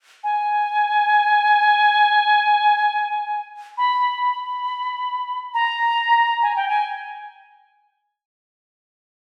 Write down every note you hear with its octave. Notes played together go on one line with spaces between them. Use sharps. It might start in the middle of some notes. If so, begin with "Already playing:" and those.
G#5
B5
B5
A#5
G#5
G5
G#5